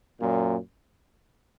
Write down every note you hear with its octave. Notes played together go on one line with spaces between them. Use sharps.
F#2 A#2